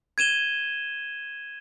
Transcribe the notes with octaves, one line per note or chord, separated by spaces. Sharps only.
G#6 D#7 E7 G7